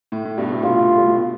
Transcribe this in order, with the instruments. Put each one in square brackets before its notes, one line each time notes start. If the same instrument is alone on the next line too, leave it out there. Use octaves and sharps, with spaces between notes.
[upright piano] A2
A2
G2 B2
A2 C3
[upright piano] G2 B2 [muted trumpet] F4
[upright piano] A2
G2 B2
A2
B2